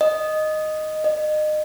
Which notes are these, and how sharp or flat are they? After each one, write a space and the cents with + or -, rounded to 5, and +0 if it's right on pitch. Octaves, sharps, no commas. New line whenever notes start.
D#5 -5
D#5 -30